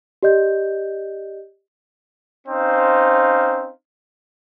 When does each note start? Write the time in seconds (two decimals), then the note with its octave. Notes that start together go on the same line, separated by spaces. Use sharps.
0.23 G4 D5 D#5 G6
2.48 C4 C#4 D#4 C5 F5